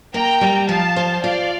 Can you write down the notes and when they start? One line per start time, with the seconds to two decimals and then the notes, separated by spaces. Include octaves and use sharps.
0.14 A#3 G5 A#5
0.41 G3
0.69 F3 F5 A5
0.96 C5
1.23 F4 D5 F5